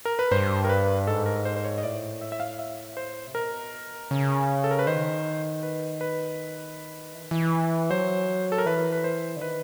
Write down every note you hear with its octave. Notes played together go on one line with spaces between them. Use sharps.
A#4
B4
G2 C5
A#4
B4
G#2 A4
A#4
C5
C5
C#5
D#5
A2 D5
E5
E5
F5
E5
C5
C3
B2 A#4
C#3
A4
A#4
B4
D#3 C5
B4
B4
E3
D#3
E3
F#3 C5
A4
A#4
E3 B4
B4
C5
D3
D#3 B4